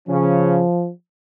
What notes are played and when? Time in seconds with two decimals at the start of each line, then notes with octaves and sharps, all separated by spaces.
0.09 C#3 F3 C#4